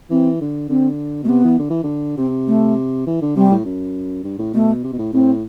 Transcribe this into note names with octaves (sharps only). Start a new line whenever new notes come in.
E3 C4
D3
D3 C4
B2 A3
C3 B3
E3
D3
E3
D3
C3 C4
A3
E3
D3
C3 G3
A2
F#2
G2
A2
B2 A3
C3
B2
A2
A2 C4